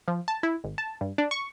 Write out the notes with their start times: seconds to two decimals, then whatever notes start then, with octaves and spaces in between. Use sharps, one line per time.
0.08 F3
0.28 A5
0.43 E4
0.64 G#1
0.78 A5
1.01 G2
1.18 D4
1.31 C#6